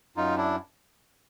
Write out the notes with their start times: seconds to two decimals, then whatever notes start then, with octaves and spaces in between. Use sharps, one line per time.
0.16 F#2 D#4 F4
0.37 D4 E4